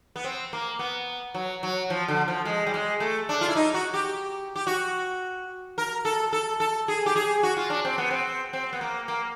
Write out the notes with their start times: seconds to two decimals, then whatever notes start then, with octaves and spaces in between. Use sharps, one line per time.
0.16 B3
0.24 C4
0.53 A#3
0.79 B3
1.34 F#3
1.63 F#3
1.90 F3
2.08 D3
2.28 F3
2.45 G#3
2.67 G3
2.74 G#3
3.00 A3
3.29 D4
3.41 F4
3.49 E4
3.56 D#4
3.74 F#4
3.94 G4
4.56 G4
4.67 F#4
5.78 A#4
6.05 A4
6.33 A4
6.60 A4
6.88 G#4
7.06 G4
7.16 G#4
7.43 F#4
7.57 F4
7.70 D4
7.85 C4
7.98 B3
8.11 C4
8.53 C4
8.73 B3
8.81 A#3
9.08 A#3